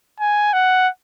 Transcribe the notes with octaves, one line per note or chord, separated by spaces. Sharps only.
G#5
F#5